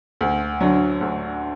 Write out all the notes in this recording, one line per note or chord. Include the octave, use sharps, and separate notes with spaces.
D2
D3 F#3
D2